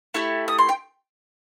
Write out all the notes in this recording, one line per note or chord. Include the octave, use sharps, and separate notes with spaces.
A3 E4 G4
D#6
C6
G5